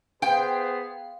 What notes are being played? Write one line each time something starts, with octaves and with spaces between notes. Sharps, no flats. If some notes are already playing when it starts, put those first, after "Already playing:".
B3 G#4 C5 F5 G5